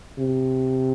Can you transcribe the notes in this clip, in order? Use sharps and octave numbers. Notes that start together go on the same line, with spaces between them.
C3